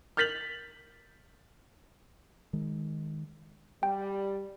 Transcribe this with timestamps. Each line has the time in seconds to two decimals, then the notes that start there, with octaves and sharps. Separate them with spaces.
0.17 F6 G6 A6 B6 F7 F#7
2.53 D#3 G#3
3.83 G3 G5